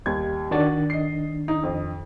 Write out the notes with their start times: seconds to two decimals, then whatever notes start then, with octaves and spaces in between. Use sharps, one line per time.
0.06 D#2 G3 G#6
0.51 D#3 D4 F#4 D5 A6
0.90 D#5 C7
1.48 D#4
1.63 F2